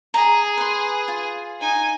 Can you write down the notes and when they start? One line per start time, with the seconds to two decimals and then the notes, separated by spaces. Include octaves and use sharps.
0.14 G#4 A#5
0.57 B4 C6
1.08 F4
1.60 D#4 G#5